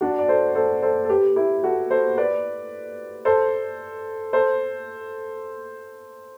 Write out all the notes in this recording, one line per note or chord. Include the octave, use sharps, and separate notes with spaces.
D4 F#4
D5
A4 C5
A4 C5
A4 C5
A4
G4 B4
E4 G4
F#4 A4
A4 C5
B4 D5
A4 C5
A4 C5